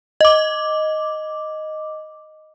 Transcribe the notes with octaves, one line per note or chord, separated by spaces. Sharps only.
D#5 D6